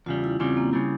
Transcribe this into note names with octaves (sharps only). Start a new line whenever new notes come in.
E2 C#3 G3 F4
E4
E2 C#3 G3 C4
A#3
C#3 G3 E4